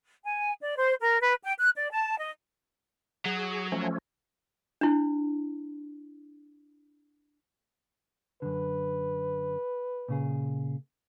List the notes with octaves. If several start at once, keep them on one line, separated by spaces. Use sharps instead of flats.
G#5
D5
C5
A#4
B4
G5
F#6
D5
A5
D#5
F#3 G#4
F3 A3 C#4
D4 E4
F#2 D3 B4
A#2 C#3 G#4